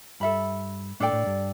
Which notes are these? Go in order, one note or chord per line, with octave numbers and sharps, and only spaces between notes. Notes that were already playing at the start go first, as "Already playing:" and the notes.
G2 A4 E5 B5
A2 D4 A4 D5 G5
A2
G2